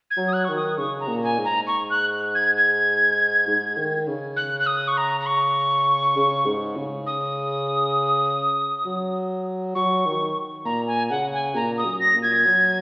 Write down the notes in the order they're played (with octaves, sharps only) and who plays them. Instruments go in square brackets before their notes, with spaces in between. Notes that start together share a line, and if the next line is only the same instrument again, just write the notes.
[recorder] G#6
[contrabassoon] F#3
[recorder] D#6
F#6
[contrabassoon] D#3 [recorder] C#6
[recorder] D#6
[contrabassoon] C#3 [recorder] C#6
[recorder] A#5
[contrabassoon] A#2
[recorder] G#5
[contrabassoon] G#2
[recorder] A#5
C#6
F#6
G#6
G#6
[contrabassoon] G#2
D#3
C#3
[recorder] F#6
F#6
D#6
C#6
A#5
A#5
C#6
[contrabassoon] C#3
G#2
C#3
[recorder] D#6
[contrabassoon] F#3
[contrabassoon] F#3 [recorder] C#6
[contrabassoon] D#3
[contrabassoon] A#2 [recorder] A#5
[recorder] G#5
[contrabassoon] C#3 [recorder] F#5
[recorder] G#5
[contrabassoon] A#2 [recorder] A#5
[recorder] D#6
[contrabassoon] F#2
[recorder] A#6
[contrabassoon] A#2
[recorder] G#6
[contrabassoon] F#3